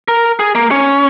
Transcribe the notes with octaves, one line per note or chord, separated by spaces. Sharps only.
A#4
G#4
A#3
C#4